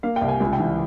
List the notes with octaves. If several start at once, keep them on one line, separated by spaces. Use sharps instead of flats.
A#3 F5
G5
C2
G#5
C#2 G#5
G5
E3